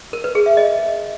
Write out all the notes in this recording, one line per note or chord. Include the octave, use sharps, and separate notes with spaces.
A#4
B4
G#4
E5
D#5